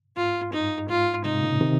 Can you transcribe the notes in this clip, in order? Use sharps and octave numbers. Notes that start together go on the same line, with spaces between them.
G#2 F4
G2 D#4
G#2 F4
G#2 C3 D#4
A#2 C#3
C3 D#3